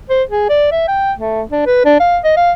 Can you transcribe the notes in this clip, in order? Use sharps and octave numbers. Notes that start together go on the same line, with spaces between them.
C5
G#4
D5
E5
G5
A3
D4
B4
D4
F5
D#5
F5